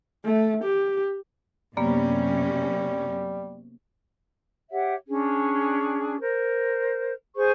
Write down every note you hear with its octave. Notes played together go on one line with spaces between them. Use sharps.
A3
G4
F#2 C3 G3 A#3 B3 C#4
G4 C#5 E5 F#5
C#4 D4 G#4
A#4 C5
G#4 C5 C#6